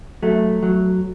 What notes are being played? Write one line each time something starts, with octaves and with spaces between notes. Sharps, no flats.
F#3 A3
F#3